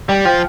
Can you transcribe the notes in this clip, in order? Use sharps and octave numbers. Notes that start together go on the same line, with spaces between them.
G3 G5
F3 G5